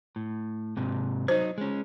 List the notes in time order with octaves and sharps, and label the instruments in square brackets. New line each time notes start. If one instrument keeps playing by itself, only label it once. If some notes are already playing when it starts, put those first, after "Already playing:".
[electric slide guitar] A2
G#2 C3
[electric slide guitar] F#3 D#4 [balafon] C5
[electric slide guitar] G#3 C#4